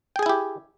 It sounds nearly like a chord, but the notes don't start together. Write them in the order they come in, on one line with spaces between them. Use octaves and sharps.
G5 G#4 G#5 E4 G4